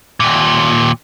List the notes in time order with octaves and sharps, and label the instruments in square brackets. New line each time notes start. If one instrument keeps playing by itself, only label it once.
[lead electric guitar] D#2 A#2